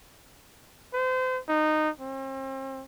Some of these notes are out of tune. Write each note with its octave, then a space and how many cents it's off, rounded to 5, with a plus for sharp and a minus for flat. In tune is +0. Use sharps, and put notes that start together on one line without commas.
C5 -35
D#4 -15
C4 +40